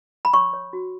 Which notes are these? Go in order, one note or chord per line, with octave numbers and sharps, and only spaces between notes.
B5
C#5 C#6
C#5
F#4